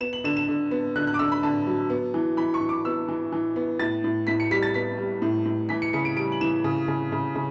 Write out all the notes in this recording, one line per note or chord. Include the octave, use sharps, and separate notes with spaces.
B3 E7
F#7
D3 E7
E7
D3
B3
D3 F#6
F#6
D6
D3 E6
B5
D3 A5
F#3
B3
E3
E3 B5
C#6
E3
D6
B3 E6
E3
E3
B3
A2 A6
A2
A2 B6
C#7
G3 B6
A6
B3 B6
G3
A2
A2
E3 B6
C#7
C#3 C#7
D7
G3 D7
F#7
E3 E7
C#3
C#3
C#3
C#3